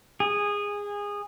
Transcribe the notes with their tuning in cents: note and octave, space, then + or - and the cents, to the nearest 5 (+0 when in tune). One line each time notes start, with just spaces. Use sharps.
G#4 -20